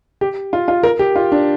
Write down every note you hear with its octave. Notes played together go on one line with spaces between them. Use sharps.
G4
F4
F4
A#4
G4
F4
D4